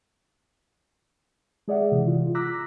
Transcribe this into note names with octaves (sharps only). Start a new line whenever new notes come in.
G#3 G#4 D5 E5 F#5
C3 E3
F4
A#5 D6 E6 F#6 A#6 B6